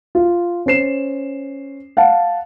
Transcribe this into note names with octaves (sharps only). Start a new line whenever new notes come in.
F4
C#4 C5 C7 E7
F5 F#5 A5